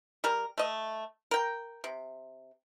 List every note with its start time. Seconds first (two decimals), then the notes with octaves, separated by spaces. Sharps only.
0.24 G3 A#4
0.58 A3 D#5
1.31 A#4 G5
1.84 C3